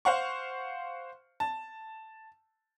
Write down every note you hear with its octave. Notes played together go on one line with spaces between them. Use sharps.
C5 F5 F#5 C#6
A5